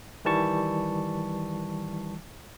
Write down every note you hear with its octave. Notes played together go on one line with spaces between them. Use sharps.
D#3 E3 G3 A5 C#6